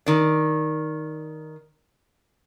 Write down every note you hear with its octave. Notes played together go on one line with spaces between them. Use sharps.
D#3 D5